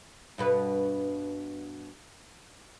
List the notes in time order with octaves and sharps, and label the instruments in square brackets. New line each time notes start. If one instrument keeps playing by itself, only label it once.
[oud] G2 B2 B4